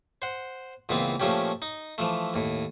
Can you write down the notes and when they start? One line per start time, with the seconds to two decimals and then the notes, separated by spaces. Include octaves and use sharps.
0.22 C5 F#5
0.89 C#2 A#2 E3 B3 C4
1.20 A#2 F3 A3 C#4 G4
1.62 D#4
1.98 E3 F3 A3
2.34 D#2 A2